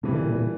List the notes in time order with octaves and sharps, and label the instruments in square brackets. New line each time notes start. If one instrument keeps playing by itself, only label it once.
[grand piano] G2 E3 G3 [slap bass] C3
[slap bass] D3
A#2
A#2